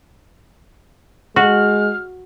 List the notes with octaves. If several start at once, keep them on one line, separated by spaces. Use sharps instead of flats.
G#3 F#4 F6